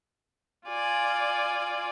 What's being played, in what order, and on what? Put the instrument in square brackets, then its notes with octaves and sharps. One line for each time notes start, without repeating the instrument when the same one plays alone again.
[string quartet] F4 D5 G#5